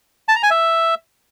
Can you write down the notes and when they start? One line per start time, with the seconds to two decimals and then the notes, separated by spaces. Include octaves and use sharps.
0.28 A5
0.36 A#5
0.43 G#5
0.50 E5